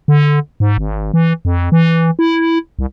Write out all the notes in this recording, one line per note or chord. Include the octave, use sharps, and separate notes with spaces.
D3
G#2
G#1
E3
F2
E3
E4
C2